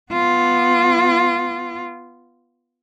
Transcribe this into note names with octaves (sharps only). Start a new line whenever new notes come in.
B3 F4